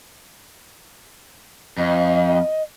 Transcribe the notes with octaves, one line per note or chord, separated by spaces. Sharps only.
F2 D#5